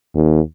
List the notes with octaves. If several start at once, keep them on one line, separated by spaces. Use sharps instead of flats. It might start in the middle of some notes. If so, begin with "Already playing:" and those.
D#2